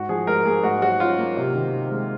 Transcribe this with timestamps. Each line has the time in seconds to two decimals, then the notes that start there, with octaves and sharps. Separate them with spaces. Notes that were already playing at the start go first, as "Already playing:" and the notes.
Already playing: G#2 F#4
0.09 F3 G#4
0.27 G#2 A#4
0.45 A#3 G#4
0.63 G#2 F#4
0.82 F#3 F#4
1.00 C#4 F4
1.18 A#3
1.37 C3
1.55 D#3
1.73 C4
1.91 G#3